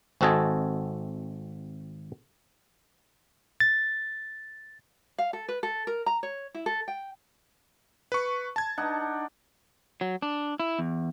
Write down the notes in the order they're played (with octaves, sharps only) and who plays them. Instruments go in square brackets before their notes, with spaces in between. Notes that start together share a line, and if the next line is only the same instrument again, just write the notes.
[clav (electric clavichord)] G#1 C4 F#4 A4 D#5 G#5
[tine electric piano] A6
[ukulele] F5
A4
B4
A4
A#4
A#5
C#5
E4
A4
G5
[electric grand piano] B4 C#6
A5 G#6
[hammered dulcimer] D4 D#4 F#5
[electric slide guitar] F#3
D4
E4
E2